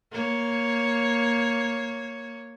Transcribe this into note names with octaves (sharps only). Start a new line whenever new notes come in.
A#3 C#5